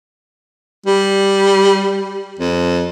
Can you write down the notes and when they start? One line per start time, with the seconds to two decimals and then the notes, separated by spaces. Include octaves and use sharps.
0.86 G3
2.39 F2